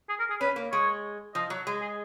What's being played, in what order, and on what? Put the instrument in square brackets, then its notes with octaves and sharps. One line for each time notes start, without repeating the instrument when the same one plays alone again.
[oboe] G#4
A#4
G#4
[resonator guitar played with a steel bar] C#4 [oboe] B4
[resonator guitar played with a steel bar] A#3
[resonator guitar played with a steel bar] G#3 [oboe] C#5
[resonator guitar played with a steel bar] F3 [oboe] D#5
[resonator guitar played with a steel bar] F#3
G#3
[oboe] G#4